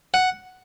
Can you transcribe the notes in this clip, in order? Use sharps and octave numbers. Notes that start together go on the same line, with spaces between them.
F#5